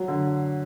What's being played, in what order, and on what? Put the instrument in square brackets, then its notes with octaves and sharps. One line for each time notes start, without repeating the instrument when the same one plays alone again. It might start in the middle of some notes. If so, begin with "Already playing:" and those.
Already playing: [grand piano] F#3
D3